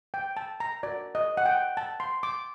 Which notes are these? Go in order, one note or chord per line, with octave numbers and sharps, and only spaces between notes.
G5
A5
A#5
F#4 A#4 D5
D#5
F#5
G5
A5
C6
D6